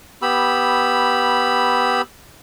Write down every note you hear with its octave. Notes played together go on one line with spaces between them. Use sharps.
B3 G4 B5 E6